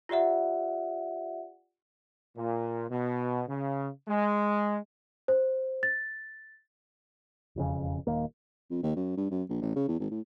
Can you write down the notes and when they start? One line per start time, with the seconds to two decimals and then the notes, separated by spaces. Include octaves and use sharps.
0.09 F4 G4 D5 E5 F#5
2.37 A#2
2.90 B2
3.48 C#3
4.08 G#3
5.28 C5
5.83 A6
7.56 E1 F2 C#3
8.07 D#1 D#2 A#3
8.71 F2
8.83 D#2
8.96 F#2
9.17 G2
9.31 F#2
9.49 A#1
9.61 A1
9.76 C#3
9.88 E2
9.99 G#1
10.11 A2